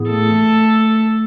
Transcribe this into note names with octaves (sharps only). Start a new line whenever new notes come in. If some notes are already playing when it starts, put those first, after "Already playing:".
Already playing: A2 E3 B3 E4 G#4
A3 A4